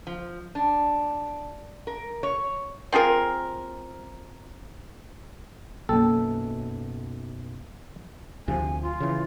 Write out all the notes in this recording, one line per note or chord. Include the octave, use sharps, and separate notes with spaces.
F3
D4
A#4
C#5
C4 F4 G#4 A#4
B1 F#2 A#3 A4
D2 C3 F3 G#5
F4
C#3 E3